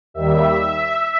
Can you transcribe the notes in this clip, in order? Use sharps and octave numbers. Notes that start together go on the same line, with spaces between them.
D#2 D#3 G3 E5